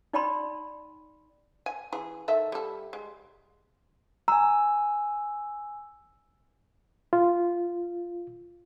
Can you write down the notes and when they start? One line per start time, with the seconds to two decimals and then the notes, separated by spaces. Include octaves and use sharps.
0.13 D#4 D5 G5 A5 B5 C6
1.66 G#5
1.93 E3 G#4
2.28 D#3 A4 E5
2.52 G3 A4
2.93 G#3
4.28 G#5 A#5 E6
7.13 F4